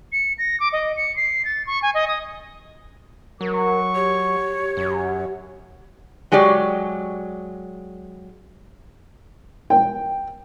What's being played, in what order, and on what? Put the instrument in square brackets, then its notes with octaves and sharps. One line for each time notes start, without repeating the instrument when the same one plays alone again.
[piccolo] C#7
A#6
D6
D#5
C#7
C7
A6
C#6
G#5
D#5
D#6
[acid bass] F#3 [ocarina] A#4 [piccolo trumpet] C#6
[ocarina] G4 [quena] C#5
[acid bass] F#2
[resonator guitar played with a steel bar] F#3 G#3 G4 D5
[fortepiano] G5